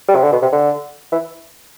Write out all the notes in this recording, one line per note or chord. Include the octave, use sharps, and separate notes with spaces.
G3
C3
D3
B2
C3
D3
E3